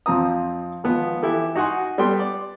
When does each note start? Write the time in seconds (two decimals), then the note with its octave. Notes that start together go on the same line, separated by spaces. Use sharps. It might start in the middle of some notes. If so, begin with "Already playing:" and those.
0.06 F2 F3 C4 A#5 D#6
0.84 G#1 F3 B3
1.22 E3 E4 G4 A4
1.55 D#4 F#4 F#5 G#5 C6
1.98 G3 B3 A4 G5 C6
2.19 D5